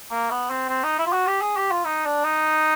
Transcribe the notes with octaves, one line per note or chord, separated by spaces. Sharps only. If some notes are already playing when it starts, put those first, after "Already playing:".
A#3
B3
C4
C4
D#4
E4
F4
F#4
G4
G#4
G4
F4
D#4
D4
D#4